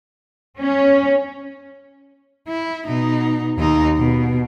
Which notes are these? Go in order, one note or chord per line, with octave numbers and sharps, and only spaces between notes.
C#4
E4
B2 D#4
D#2 D#4
B2